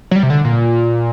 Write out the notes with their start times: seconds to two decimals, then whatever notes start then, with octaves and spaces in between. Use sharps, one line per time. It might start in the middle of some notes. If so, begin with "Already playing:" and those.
0.11 F#3
0.16 G3
0.23 C3
0.30 D3
0.45 A#2